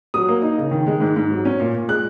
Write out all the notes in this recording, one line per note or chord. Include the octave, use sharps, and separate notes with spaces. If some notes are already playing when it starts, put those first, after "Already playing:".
F#3 D#6
A#3
D#4
C#3
D#3
G#3
G#2
G#2
F#3
C#4
A#2
A#2
G#3 F#6